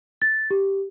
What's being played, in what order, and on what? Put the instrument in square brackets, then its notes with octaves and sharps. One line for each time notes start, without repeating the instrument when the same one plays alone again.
[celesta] A6
G4